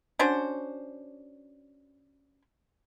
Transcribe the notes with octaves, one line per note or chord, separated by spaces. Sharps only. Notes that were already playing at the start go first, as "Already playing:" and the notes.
C#4 D4 F#4 C5